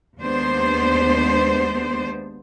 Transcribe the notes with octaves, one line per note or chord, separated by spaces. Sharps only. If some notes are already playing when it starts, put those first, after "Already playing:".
D#2 G#3 B3 D4 C5